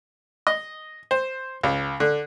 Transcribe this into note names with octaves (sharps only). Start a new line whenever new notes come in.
D#5
C5
C#2
D3